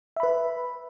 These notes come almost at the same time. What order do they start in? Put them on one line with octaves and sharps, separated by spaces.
E5 B5 B4